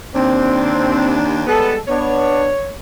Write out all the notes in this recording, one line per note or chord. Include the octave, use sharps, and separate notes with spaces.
D#2 C4 D4
G3 G#3 B3 A4
B3 D4 C#5